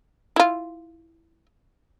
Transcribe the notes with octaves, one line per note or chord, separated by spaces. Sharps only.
E4 F4